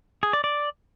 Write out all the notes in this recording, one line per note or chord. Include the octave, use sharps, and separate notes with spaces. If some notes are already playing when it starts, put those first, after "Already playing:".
G#4
D5
D5